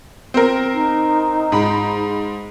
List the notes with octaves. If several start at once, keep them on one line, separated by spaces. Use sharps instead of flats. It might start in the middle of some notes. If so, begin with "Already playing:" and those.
C4 A#4
D#4
G#2 B5